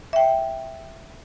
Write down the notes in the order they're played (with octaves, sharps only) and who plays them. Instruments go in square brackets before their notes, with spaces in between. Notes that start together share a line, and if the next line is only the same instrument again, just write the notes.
[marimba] E5 G5